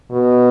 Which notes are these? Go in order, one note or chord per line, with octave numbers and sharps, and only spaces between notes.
B2